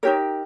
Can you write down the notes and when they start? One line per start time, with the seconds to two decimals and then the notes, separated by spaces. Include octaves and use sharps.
0.03 D#4 G4 A#4 C#5